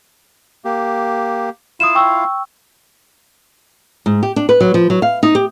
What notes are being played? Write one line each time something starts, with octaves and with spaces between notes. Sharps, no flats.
A#3 G4
E4 F4 F5 D#6 E7
G5 C#6 E6
G#2
G4
D4
B4
F#3
F3
F#3
F5
D#4
G4